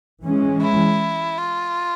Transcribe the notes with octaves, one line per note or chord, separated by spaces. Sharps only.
E3 G#3 C#4
E4
F4